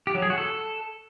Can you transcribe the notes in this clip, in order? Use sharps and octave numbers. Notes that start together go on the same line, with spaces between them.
G4
F#3
G#4
F#4
A4